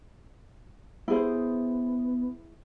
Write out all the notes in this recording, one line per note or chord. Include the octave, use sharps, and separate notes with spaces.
B3 E4 G#4 C5